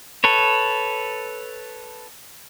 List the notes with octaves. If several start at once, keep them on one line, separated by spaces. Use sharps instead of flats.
A4 B4 C#5